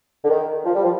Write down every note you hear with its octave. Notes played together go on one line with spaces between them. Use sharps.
D3
D#3
F3
G3
F3